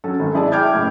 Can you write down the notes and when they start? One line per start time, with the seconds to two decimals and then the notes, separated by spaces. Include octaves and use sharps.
0.04 F#3 C#4 A4
0.19 G#1
0.35 E4 G#4 D5 A5
0.52 E5 G5 D6 F6 G6 G#6
0.74 F#1 A2